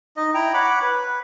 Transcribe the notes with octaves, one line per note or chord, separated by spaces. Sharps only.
D#4 D#5
E4 G5 A#5
C#5 F#5 B5 D6
B4